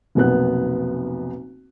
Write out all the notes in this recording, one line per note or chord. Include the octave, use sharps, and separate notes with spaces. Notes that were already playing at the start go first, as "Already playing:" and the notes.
F1 B1 A#3 B3 F#6